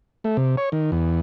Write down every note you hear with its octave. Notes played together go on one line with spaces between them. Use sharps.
A3
C3
C#5
D#3
E2